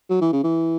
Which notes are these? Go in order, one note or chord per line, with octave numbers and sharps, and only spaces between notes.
F#3
E3
C#3
E3